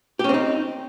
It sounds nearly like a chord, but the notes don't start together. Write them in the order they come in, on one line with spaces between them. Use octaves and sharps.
G4 C#4 C4 D#4